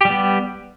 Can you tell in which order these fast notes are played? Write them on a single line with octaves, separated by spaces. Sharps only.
G4 G3 B3